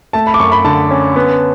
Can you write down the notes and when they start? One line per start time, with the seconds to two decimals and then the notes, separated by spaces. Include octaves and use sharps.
0.13 A3 A5
0.27 B5
0.34 D6
0.39 F#2 C#6
0.52 B5
0.65 D3 A5
0.91 C#4
1.16 B3